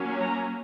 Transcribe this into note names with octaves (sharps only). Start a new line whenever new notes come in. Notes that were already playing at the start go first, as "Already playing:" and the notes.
Already playing: F#3 A#3 C#4
A#5